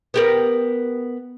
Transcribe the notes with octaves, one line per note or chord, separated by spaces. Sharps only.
B3 G4 A#4